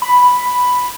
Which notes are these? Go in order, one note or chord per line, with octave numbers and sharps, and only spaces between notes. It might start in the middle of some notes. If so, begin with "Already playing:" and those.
B5